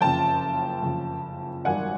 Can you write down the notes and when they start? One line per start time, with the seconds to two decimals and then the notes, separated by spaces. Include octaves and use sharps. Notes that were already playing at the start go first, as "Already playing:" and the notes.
0.01 F#1 F2 C#3 G5 A5
0.82 F#1 F2 C#3
1.65 G#1 F#2 D#3 G3 F#5 G#5